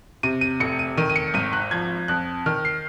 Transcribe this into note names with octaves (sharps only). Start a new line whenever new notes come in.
C3 D#7
D#7
F1 C#7
D#7
D#3 D#7
D#7
C#7
G#1 D#7
F#6
F3 G#6
F2 F#6
D#3 F6
C7